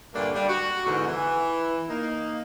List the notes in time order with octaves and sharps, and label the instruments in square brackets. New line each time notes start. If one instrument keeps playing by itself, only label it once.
[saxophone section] G2 A#2 D3 A3 A#3 D4
G3 D4
F#4
E2 G#2 B2 D3
E3
A#3 D#4